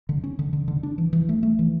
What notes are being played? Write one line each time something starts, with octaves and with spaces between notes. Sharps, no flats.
D3
C#4
D3
D3
D3
D4
E3
E3
A3
A3
E3